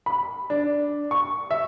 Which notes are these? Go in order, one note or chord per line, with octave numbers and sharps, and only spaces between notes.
B5
D4
C#6
E5